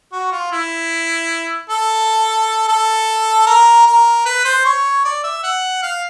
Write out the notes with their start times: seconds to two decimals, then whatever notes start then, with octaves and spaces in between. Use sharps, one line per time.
0.12 F#4
0.32 F4
0.52 E4
1.70 A4
2.68 A4
3.47 A#4
3.86 A#4
4.26 B4
4.45 C5
4.65 C#5
5.04 D5
5.24 E5
5.43 F#5
5.82 F5